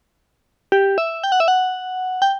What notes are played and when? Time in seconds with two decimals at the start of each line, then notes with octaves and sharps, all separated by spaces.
0.72 G4
0.98 E5
1.24 G5
1.32 F#5
1.40 E5
1.48 F#5
2.22 G5